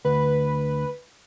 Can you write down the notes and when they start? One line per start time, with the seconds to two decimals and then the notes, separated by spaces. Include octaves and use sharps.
0.05 D2 B4